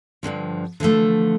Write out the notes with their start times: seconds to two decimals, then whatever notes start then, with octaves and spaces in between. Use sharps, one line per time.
0.23 G2 A#2 D3 F3
0.80 D3 E3 F3 A3